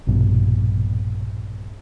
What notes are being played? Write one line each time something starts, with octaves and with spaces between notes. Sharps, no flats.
A#1 G2 B2